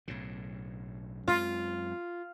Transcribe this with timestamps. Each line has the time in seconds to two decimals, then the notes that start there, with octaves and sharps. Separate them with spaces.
0.08 B1 A2 C#3
1.28 F#2 G#3 C4 F4